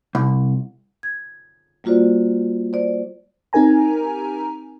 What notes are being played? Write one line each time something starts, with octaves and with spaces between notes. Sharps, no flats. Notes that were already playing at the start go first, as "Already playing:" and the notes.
C2
G#6
G3 A#3 F4 F#4 C5 D5
C5 D5
C4 D#4 G4 A#4 G#5 A#5